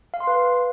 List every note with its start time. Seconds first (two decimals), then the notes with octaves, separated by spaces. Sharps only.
0.14 F5
0.20 C6
0.27 B4